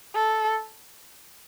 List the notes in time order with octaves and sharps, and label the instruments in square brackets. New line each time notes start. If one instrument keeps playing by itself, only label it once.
[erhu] A4